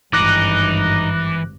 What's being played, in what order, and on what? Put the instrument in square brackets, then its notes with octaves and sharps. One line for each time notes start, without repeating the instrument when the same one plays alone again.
[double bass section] G#1 G2 [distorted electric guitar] E3 [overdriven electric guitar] D#4 [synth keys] D6 F#6 A#6